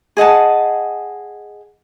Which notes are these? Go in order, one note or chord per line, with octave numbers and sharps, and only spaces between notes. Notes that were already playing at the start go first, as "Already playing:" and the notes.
G#4 D#5 F#5 A5